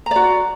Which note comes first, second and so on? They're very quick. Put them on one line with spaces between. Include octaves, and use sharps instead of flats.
A#5 D5 F#4